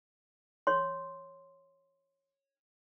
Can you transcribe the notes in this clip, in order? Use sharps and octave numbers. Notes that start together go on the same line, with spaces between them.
C#5 C6